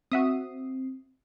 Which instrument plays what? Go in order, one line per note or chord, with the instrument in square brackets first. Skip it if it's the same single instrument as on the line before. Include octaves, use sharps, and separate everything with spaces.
[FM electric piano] C4 [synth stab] F#4 E5 D#6